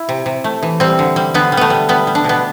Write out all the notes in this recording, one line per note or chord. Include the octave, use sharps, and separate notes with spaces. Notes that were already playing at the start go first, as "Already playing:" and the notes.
Already playing: E4
C3
C3
A3
E3
G3 C4
D3
G3
D3 B3
G3
A3 B3
G3
G3 B3
G3
D4
B2 B3